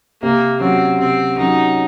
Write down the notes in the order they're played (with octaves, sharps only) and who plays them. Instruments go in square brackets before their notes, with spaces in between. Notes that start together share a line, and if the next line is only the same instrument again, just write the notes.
[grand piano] C3 [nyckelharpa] A#3
[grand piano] F#3 C#4 F#4 [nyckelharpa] C4
[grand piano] C3 [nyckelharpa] C4
[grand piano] F#3 C#4 F#4 [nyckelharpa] D#4